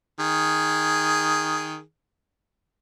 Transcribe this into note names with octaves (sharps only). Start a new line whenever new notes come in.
D#3 G#4